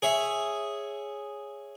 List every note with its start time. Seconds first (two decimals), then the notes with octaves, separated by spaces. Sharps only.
0.02 G#4 C#5 E5